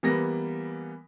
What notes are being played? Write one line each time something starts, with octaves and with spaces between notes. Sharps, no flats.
E3 G3 A#3 B3 A#6